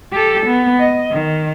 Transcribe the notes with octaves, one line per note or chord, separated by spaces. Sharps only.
G4 A4
B3
D#5
D#3